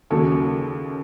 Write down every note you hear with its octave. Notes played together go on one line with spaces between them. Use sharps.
D#2 C#3 F#3 A4